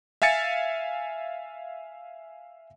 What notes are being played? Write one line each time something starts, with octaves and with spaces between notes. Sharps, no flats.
E5 F5 G#5 A6 C#7